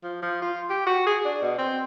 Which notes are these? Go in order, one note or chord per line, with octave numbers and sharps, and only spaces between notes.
F3
F3
F4
G4
F#4
G#4
D4
B2
C4